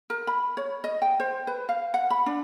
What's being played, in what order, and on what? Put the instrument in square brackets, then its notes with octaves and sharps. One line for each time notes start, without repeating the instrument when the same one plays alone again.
[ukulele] A#4
B5
C#5
D#5
G5
C5
B4
F5
F#5
B5
D4